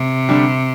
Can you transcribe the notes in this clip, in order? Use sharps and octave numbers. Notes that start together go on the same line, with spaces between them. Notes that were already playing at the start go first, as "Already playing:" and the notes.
Already playing: C3
D3 G3 D4